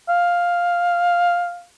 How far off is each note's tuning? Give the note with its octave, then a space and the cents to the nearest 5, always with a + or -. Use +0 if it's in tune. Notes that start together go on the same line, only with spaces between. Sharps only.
F5 +5